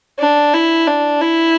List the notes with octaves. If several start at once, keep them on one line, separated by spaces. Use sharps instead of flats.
D4
E4
D4
E4